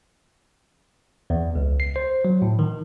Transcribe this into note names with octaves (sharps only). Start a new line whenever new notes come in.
E2
C#2
C7
C5
F#3
A2
D#3